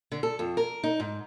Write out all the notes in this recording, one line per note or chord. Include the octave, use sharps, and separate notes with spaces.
D3
A4
F2
A#4
D#4
G#2